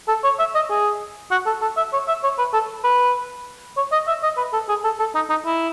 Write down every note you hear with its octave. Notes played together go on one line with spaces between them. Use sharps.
A4
C#5
E5
D#5
G#4
F#4
A4
A4
E5
C#5
E5
C#5
B4
A4
B4
C#5
D#5
E5
D#5
B4
A4
G#4
A4
A4
D#4
D#4
E4